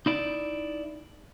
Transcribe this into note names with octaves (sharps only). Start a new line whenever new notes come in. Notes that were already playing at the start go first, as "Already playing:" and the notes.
D#4 E4 D5